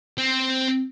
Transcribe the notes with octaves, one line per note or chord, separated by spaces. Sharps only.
C4